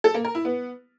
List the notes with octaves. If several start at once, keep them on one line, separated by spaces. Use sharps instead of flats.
A4
A#3
A#4
E4
B3